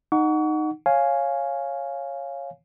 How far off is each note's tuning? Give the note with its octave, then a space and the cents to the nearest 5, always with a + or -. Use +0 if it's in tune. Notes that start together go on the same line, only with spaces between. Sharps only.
D#4 -10 F#5 +0 C#6 +35
C#5 -10 F5 +0 G#5 +0